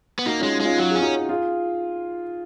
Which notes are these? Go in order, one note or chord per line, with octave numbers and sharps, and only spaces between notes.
B3
A#3 D#4 F#4
G#3 C#4 F4
D#4
G#3 C#4 F4
F#3 F#4
G#4
C#4
D#4 F#4
F4 G#4